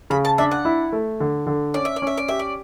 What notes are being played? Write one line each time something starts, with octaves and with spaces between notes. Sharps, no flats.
C#3 B5
A5
D4 E5
F#5
E4
A3
D3
D3
C#4 D5
E5
D5
C#4 E5
D5
G4 E5
D5